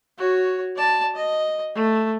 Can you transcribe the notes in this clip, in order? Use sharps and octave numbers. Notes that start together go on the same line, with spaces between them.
F#4 C#5
D5 A5
D#5
A3